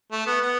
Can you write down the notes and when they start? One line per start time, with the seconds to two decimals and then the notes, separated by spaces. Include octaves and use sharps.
0.12 A3
0.26 B3
0.41 B3